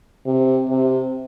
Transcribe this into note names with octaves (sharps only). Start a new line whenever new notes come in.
C3
C3